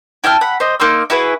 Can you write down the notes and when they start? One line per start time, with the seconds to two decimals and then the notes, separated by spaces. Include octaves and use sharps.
0.24 E4 G5 A5 F6
0.41 F#5 B5
0.60 C5 D#5
0.80 A#3 D#4 C6 E6
1.10 E4 F#4 G#4 B4